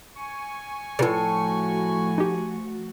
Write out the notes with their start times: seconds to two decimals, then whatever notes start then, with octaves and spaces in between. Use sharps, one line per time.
0.17 G#5 C#6
0.99 A2 C#3 F3 A3 F4 F#4 B4 D5
2.18 D#4 G4